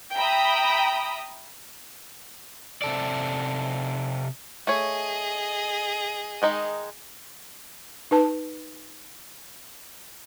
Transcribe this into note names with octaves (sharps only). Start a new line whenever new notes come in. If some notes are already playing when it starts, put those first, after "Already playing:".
E5 G5 A#5 B5 D#6
C3 A4 D5
A3 G#4 C#5 D#5
D#3 G#3 D#4
D#4 B4 A5